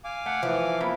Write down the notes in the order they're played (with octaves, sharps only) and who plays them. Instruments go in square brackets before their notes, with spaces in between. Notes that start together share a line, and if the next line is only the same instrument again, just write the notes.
[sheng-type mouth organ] F5 G#5 D6
[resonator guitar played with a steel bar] A3 [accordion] F#5
[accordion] E3 [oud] F3 [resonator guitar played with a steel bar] A3 E5
[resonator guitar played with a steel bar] A#3 B3 E4